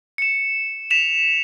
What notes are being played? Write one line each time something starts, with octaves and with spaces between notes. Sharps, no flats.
C#7 E7
B6 E7 F7